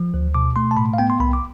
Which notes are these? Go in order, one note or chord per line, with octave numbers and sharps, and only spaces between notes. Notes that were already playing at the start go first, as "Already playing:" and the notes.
Already playing: F3
D2
B2 D6
A3 C6
A5
A2 B5
F5
B3 G5
C6
C2 B5
D6